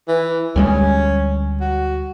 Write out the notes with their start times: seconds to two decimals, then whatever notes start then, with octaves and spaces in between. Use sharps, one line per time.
0.08 E3
0.56 D2 G3 G#3 C#4
1.61 F#4